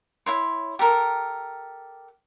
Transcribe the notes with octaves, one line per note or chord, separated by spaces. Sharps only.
E4 C#5 C6
G4 A4 A#4